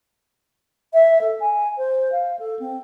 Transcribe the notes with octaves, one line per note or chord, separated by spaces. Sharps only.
E5
A4
G#5
C5
F5
A4
C4